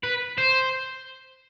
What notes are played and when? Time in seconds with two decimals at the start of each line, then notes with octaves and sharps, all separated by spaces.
0.04 B4
0.38 C5